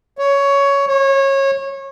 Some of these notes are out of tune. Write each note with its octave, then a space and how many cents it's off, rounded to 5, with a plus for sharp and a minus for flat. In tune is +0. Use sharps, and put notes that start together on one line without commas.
C#5 +10
C#5 -25